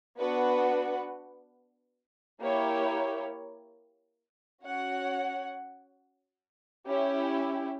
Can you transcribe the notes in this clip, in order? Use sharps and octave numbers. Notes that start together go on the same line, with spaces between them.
B3 D4 F#4 B4 F#5
A#3 E4 G4 C#5
C#4 F#4 C#5 F#5
C#4 E4 G4